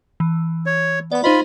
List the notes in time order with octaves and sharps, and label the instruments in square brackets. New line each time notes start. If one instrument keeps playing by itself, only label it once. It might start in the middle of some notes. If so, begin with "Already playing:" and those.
[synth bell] E3
[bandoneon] C#5
[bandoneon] B3 [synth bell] D5 B5
[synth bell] D#4 C5 D#5 [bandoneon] F4 B5